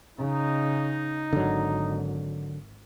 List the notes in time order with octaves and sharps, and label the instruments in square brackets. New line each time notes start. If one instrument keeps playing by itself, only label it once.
[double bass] C#3 [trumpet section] D#4
[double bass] G#1 [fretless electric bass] D3 F#3